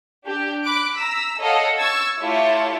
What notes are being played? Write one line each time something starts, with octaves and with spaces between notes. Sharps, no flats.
D4 G4
B5 D6 F#6 D7
A#5 E6 B6
A4 C#5 D#5 F5 F#5
C#6 E6 G#6 A6
A3 E4 F4 G4 C#5 A5